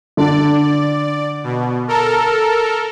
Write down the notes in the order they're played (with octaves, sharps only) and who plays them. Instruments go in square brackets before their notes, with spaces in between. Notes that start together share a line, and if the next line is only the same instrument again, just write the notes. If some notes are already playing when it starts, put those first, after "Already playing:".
[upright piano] D3 [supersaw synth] D5
[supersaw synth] B2
A4 A#4